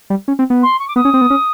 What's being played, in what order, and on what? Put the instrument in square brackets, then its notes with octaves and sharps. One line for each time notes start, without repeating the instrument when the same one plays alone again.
[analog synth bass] G3
C#4
C4
B3
[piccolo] C6
C#6
D6
[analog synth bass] B3 [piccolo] D#6
[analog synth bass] C#4
C4
B3
C#4